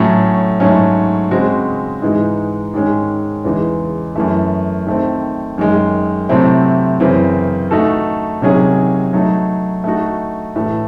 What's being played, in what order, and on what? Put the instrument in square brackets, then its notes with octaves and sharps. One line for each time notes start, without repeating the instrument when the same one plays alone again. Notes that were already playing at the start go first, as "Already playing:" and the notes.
Already playing: [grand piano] A2 F#3 A3 C#4
G#2 F#3 A3 C#4
C#3 G#3 C4 F#4
G#2 E3 G#3 D#4
G#2 D#3 G#3 C#4
E2 C#3 E3 G#3 D#4
F#2 E3 A3
D#3 A3 C4
F#2 D#3 G#3
C3 F#3 A3 C4 E4
F#2 C#3 E3 C4
A3 D#4 F#4 A4
C3 D#3 F#3 C#4 G#4
F#3 A3 D#4
A3 D#4 F#4
A2 E3 A3